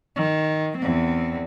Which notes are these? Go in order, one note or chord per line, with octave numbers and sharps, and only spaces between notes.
D#3
E2 C4